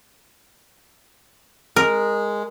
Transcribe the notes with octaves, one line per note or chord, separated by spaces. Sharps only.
G#3 A#4